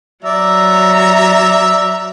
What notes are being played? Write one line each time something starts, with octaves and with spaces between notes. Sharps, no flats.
F#3 D5 E5 A#5